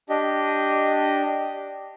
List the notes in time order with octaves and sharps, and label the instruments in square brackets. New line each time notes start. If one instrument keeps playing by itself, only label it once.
[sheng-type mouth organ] D4 G4 D#5